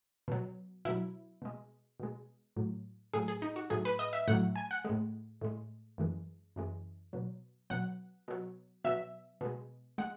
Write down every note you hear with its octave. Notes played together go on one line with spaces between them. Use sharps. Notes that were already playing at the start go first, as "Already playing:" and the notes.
B2 F#3
B2 F#3 E4
B2 G#3
B2 G#3
A2 F#3
A2 F#3 G#4
G#4
D#4
F#4
A2 F#3 G#4
B4
D#5
E5
A2 F#3 F#5
G#5
F#5
A2 G#3
A2 G#3
F#2 E3 G#3
F#2 E3 G#3
B2 F#3
B2 F#3 F#5
B2 F#3
B2 F#3 E5
B2 G#3
G#3 F#5